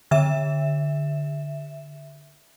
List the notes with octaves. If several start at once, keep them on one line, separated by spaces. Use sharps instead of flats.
D3 E5 E7